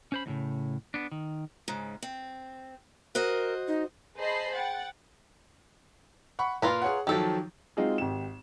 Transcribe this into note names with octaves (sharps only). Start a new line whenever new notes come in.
C#4 C5 B5
D#2 A2 C#3
B3 D4
D#3
G#2 C#3
C4
F#4 A#4 C5 D#5
D#4
G#4 C5 D#5 A5 B5 C7
F#5 G5 A6
F#5 B5 C#6
A#2 F4 A#4 B4
G#4 C#5 F#5
D#3 F3 F#3 G4 A4
G#3 C4 D#4 F4 F#4 G#4
G#1 G4 E7